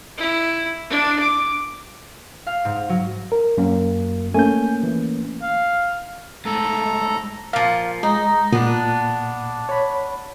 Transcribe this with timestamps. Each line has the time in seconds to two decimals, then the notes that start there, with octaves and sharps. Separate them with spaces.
0.18 E4
0.90 D4
1.19 D6
2.47 F5
2.65 G#2
2.89 F#3
3.32 A#4
3.58 F#2 A#3
4.34 A3 A#3 C#4 G#5 G6
4.83 E3
5.42 F5
6.46 G#2 A3 A4 A#5
7.53 A#2 F3 F5
8.03 G#3 D#4
8.52 A#2 B3 D4
9.69 C#5 B5